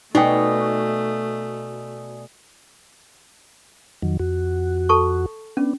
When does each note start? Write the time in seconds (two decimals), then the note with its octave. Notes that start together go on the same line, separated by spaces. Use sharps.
0.15 B2 A3 D#4 D5 G5 G#5 D#6
4.03 F2 D#3 F#3
4.19 F2 F#4
4.89 A4 A5 C#6
5.57 B3 C#4 D4